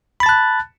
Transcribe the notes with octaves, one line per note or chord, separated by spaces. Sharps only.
A5 B5 F#6 A6